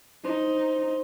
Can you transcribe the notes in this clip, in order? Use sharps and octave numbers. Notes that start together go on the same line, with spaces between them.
D#4 C5